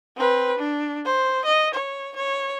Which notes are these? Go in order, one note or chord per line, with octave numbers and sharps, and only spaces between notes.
C4 B4
D4
C5
D#5
C#5
C#5